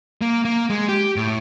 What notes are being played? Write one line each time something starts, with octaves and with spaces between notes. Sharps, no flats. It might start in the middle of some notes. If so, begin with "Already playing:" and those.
A#3
A#3
G#3
G4
A2